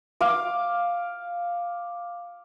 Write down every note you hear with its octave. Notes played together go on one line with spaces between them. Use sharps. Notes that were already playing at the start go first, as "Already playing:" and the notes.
F5 D6